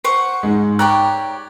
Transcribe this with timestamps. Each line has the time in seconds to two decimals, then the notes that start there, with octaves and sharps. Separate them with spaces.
0.04 C5 F#5 C#6
0.43 G#2 G#3
0.79 G4 C#5 D5 G5 A#5 F#6